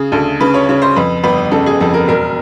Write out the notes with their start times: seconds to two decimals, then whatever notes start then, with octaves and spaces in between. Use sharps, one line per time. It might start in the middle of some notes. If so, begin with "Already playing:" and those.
Already playing: C#3 G#4
0.12 D2 A4
0.41 C#3 B4
0.54 C#5
0.69 C#3 C#5
0.82 C5
0.96 F2 B4
1.24 G1 B4
1.51 C#3 A4
1.66 G#4
1.80 F2 A4
1.94 A#4
2.08 E1 A#4